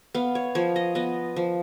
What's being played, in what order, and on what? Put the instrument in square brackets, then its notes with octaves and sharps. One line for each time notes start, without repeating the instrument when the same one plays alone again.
[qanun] B3 F5
C#5
F3 C#5
D#5
B3 D#5
F3